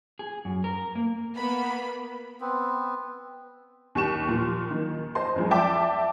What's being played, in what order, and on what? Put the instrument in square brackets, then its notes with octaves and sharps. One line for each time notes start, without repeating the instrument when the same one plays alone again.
[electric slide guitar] G#4
F#2
A#4
A#3
[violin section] A#3 B3 B5
[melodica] B3 C4
[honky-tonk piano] D#2 G4 C#6 E7
A#2 F3
D#3
C5 D#5 A5 C6
F2 F3 G#3
D5 E5 G5 A5 D6